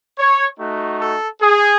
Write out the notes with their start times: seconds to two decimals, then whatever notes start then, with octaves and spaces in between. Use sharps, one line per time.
0.18 C#5
0.59 A3 D#4 F#4
1.00 A4
1.40 G#4